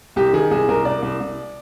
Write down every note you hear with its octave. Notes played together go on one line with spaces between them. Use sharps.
C2 G4
D#3 G#4
C2 G#4
C2 A#4
C2 D5
C2
C2